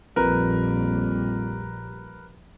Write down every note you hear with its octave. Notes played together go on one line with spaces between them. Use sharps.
A#1 F2 G3 A#4 B4